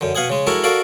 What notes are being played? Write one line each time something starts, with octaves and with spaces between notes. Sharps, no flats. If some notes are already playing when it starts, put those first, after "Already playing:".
F#2 D3
B2 F5 F#5 G#5 D#6
C#3 G#3
G#3 E4 F#4 A4 A#4
F#4 A4 A#4 D5 F5